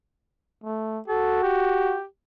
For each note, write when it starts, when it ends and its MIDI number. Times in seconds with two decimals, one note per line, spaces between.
0.64 1.00 57
1.08 1.97 66
1.08 1.39 69
1.43 2.05 67